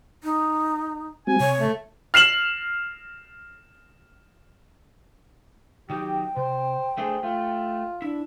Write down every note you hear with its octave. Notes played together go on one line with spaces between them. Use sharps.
D#4
G3 C4 F#4 G#5
C3 C#5
A3
F6 C7 E7 F#7
D#3 F#3 D#4 G4 G5
C3 C5
A3 D4 G#4 C5
A3 F4
D4 E4